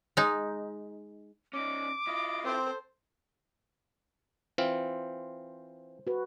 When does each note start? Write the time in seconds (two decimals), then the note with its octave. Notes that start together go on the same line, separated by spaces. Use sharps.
0.17 G#3 D#4
1.53 C#4 D#4 D6
2.07 E4 F4 D#5
2.44 C4 A4 C5
4.58 E3 C4 F4 C5
6.07 F#4 B4